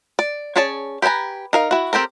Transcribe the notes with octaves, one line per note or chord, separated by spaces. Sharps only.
D5
C#4 G#4 C#5 D5 A5
G4 B4 C5 G#5 A#5
D#4 A#4 F5
E4 F#4
C4 G4 A4 A#4